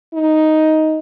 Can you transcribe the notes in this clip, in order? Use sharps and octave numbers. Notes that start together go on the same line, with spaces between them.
D#4